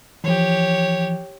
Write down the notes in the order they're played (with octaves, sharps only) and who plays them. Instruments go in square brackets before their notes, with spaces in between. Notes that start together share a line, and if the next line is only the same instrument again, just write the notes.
[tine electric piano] E3 F3 [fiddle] G4 C#5